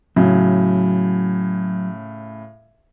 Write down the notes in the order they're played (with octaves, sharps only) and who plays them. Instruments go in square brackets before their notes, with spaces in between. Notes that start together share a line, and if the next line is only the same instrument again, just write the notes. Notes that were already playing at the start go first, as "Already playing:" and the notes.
[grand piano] A2 C#3 [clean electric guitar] F#3